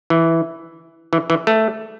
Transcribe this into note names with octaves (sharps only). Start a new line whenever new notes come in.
E3
E3
E3
A3